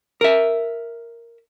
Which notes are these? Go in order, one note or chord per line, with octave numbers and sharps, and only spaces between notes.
A#4 E5